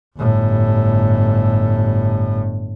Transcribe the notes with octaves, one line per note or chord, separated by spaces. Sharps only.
G1 A2